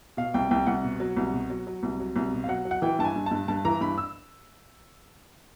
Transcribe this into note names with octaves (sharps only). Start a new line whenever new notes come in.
B2 F5
C2 G5
C2 G5
C2 F#5
B2
F#3
C2
B2
F#3
F#3
C2
F#3
C2
B2
F5
F#3 F#5
F#3
F#5
E3 G5
G2 A5
G#5
G2
G2 A5
G2 A5
E3 A#5
G2 B5
E6